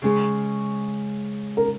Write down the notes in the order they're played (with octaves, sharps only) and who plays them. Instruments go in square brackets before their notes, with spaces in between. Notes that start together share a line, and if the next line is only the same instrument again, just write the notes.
[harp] C#3 G#3 C#4 [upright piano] G#4
[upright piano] A#4